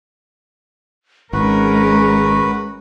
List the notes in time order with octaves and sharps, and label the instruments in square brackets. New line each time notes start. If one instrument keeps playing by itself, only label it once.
[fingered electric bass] G#1 [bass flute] G#3 [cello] C#4 A#4 [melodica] F#4 B4